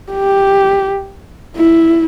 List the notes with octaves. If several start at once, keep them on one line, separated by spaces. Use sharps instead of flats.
G4
E4